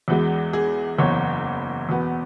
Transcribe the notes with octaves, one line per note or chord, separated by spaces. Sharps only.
E2 E3 G#3 F#4
G#4
F#1 E2 E3 C#5
E2 B2 B3